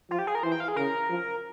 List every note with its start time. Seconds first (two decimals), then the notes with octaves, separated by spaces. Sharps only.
0.10 F3 F4
0.19 G4
0.27 G#4
0.35 A#4
0.43 E3 C5
0.52 G5
0.60 F5
0.68 G#4
0.76 C#3 A#4
1.09 F3